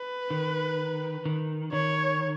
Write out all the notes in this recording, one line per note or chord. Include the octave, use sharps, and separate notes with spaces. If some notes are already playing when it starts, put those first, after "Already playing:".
Already playing: B4
D#3
D#3
D#3 C#5